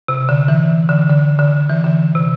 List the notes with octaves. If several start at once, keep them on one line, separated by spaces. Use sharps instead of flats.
C3
D3
E3
D3
D3
D3
E3
D3
C3